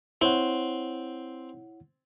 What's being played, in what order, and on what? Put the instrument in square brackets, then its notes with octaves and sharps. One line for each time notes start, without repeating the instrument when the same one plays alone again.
[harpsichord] C4 [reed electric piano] E4 C#5 F#5